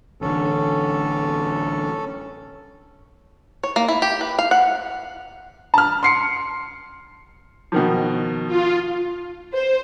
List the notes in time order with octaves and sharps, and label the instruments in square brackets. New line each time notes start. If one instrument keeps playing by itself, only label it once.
[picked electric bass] A1 D3 [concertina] C#4 A4
[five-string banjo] C#5
A#3
E4
G4
B4
F5
F#5
[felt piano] A5 F6
C6 C7 C#7
[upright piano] B2 D#3 F3
[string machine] F4
[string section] C5